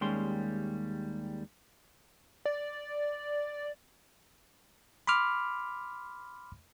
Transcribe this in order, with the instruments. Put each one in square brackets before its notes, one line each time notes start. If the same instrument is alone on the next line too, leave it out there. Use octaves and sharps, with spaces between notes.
[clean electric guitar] D#2 G3 G#3 C#4 C6
[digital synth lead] D5
[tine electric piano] B5 C6 D6 F6